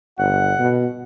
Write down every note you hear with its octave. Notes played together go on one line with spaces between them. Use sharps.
G1 F#5
B2